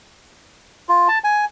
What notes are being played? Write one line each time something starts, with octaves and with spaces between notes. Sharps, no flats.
F4
A5
G#5